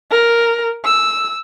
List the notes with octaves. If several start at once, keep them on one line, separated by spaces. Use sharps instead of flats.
A#4
E6